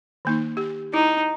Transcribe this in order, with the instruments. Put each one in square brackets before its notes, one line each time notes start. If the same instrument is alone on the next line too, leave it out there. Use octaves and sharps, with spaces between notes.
[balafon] D#3 A#3 D#4
G4
[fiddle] D#4 [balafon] E4